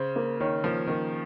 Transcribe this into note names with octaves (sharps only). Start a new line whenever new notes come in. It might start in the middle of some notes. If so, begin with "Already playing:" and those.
Already playing: C#3 C5
A#3
D#3 C#5
F3 A#3
D#3 A#3